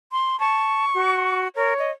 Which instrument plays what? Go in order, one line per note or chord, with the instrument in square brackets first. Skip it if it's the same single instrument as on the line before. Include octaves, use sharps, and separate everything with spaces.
[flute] C6
[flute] A5 [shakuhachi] C#6
[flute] F#4
[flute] A#4 [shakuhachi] C#5
[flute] D#5